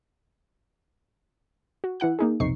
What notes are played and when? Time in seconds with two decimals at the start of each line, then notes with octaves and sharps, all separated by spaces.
1.84 F#4
2.00 E3 E4 F#5 F#6
2.19 A#3 D#4 G#4
2.40 B1 F2 C3 D#4 C#6 C7